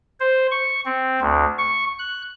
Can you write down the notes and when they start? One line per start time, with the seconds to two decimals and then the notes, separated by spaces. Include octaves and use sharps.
0.20 C5
0.51 C#6
0.85 C4
1.21 D2
1.58 C#6
1.99 F#6